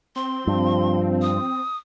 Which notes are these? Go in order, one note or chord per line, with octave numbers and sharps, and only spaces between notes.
C4 C6
G2 F3
D#6